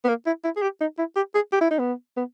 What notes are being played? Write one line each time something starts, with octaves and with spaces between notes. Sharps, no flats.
B3
A#3
E4
E4
G#4
G4
D#4
E4
G4
G#4
G4
E4
D#4
B3
B3